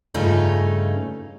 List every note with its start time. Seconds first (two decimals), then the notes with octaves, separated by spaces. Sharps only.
0.14 G2 C#3 A3 C#4 D#4 F4